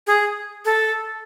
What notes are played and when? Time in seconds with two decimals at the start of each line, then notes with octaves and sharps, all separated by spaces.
0.07 G#4
0.65 A4